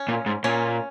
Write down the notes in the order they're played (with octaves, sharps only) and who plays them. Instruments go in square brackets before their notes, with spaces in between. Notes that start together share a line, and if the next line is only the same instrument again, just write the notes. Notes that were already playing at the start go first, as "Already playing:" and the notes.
Already playing: [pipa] C#4
[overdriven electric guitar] A#2
G#2
[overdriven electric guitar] A#2 [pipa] C#4